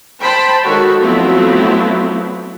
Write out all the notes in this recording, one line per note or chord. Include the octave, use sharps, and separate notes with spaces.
C5 G5 A5 B5 C6
D#3 G#3 F#4 A4 C#5
F3 F#3 A3 B3 C4 E4